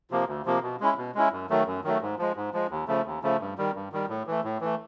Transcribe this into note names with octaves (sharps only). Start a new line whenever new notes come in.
C3 F3 A#3
D2
C3 F3 A#3
B2
G#3 C#4 E4
B2
G#3 C#4 E4
F#2
D#3 F#3 A3
F#2
D#3 F#3 A3
G#2
F3 G#3
G#2
F3 G#3
D#2
C#3 F3 A3
D#2
C#3 F3 A3
G2
D#3 G3
G2
D#3 G3
A2
E3 A3
A2
E3 A3